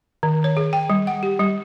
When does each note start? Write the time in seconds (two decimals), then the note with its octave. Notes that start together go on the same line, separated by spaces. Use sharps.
0.23 D#3
0.44 C#5
0.57 G#4
0.73 G5
0.90 G3
1.07 F#5
1.23 G4
1.39 G3